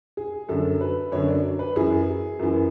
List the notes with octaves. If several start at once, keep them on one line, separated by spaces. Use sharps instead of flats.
G#4
F#2 D3 F#3 A4
B4
F#2 D3 F#3 C#5
D5
B4
F#2 E3 G#4
F#2 E3